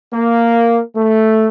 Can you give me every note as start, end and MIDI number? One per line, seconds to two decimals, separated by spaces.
0.13 0.80 58
0.95 1.48 57